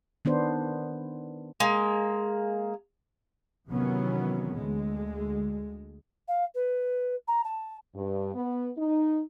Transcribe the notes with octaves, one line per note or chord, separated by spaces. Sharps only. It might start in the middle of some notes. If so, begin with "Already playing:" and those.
D#3 B3 D4 C5
G#3 A#3
C3 D#3 E3 F#3 B3 C#4
D2 D3 G#3
F5
B4
A#5
A5
G2
B3
D#4